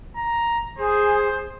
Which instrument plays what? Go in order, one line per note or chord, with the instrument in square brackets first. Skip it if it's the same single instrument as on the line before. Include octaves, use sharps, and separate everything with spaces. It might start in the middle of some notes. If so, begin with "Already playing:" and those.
[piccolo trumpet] A#5
[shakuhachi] G#4 [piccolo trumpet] C5